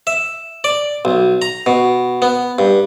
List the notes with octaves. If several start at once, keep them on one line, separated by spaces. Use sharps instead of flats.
E5
D5
B1
A#5
B2
B3
G2